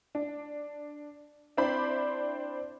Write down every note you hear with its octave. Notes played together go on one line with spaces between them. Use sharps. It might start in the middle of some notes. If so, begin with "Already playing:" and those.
D4
C4 D4 E4 C5 D5 B5